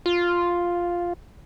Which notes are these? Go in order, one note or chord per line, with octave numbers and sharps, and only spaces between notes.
F4